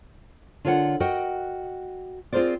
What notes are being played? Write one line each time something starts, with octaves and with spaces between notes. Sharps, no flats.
D3 F4 A#4 C#5 D#5 F#5
F#4 A#4 D#5 F#5 G5
C4 F4 G#4 A#4 C5 D5